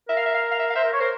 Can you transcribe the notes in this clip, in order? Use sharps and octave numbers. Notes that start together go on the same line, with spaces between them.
A#4 E5
F5
E5
F5
F5
E5
F5
C5 E5
A#4
C#5
A#4 C5